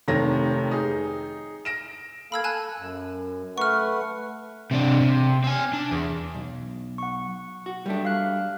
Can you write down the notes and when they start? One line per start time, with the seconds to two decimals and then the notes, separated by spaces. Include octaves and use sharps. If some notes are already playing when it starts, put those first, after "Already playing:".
0.08 F1 C3 D#3 C#5 A#6
0.71 D#4 G#4
1.65 A#6 D7 E7
2.32 A#3 A4 F5 B5 E6 G#6
2.44 A4 G#5 A5 F#6
2.78 F#2
3.58 A3 B4 F#5 C#6 F6
4.71 C3 D4
5.01 C3
5.44 C4 G#5
5.73 D4
5.91 E2
6.34 B1
6.98 F#5 C#6
7.66 F#4
7.86 G3 A3 D4
8.05 F5 F#6